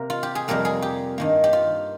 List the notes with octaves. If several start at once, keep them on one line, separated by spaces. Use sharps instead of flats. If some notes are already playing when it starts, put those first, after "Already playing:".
Already playing: C3 A#3 A#4
F4
G4
G#4
F2 C3 G3 A#3 A#4
G#4
G4
G2 D#3 A#3
G4
F4